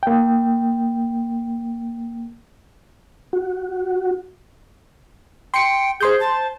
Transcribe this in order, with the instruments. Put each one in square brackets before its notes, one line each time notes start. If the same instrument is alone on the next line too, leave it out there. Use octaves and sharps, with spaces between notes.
[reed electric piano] A#3 G5
[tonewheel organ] F#4
[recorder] G5 [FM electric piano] C6 C#7
[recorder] G#4 [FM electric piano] C5 C6 G6
[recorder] A5